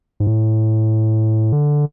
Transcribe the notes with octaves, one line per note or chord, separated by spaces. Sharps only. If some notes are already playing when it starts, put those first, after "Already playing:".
G#2
A2
D3